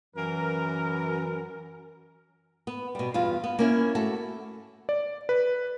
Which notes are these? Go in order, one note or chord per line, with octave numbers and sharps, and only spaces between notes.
F#2 E3 A#4
B3
B2 G3
E2 G2 F4 F5
B3
A#3 C#4 E4
A3 F#4 A4
D5
B4